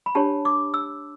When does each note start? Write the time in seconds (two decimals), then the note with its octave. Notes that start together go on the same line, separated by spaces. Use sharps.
0.06 B5
0.15 D4 G4 C#5 A5
0.45 D6
0.74 E6